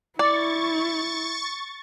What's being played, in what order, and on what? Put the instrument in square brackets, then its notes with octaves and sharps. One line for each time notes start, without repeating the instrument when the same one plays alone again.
[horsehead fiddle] E4 [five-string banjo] D5 [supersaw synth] C#6 A6